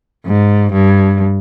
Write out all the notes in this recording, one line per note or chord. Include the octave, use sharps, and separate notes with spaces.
G#2
G2